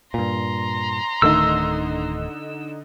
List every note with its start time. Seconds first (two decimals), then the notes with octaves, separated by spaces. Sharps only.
0.14 G2 A#2 A#5 C6
1.22 D1 D3 D#3 A3 D#4 E6